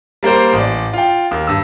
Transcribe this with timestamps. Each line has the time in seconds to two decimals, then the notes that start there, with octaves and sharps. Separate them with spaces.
0.23 G3 A#3 A#4 C5
0.53 A1 D5
0.93 F4 G5
1.31 D#2
1.47 G2 E6